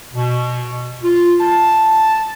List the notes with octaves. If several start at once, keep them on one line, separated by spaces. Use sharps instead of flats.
B2
F4
A5